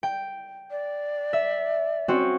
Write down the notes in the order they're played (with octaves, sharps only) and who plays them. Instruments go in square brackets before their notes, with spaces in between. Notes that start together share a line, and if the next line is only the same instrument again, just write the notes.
[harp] G5
[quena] D5
[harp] E5
C4 C#4 F#4